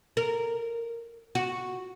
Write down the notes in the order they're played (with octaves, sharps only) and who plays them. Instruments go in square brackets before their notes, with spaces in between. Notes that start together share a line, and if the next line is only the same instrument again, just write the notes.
[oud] A#4
F#4